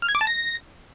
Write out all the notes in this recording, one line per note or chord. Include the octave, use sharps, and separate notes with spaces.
F6
G#6
D6
A5
A#6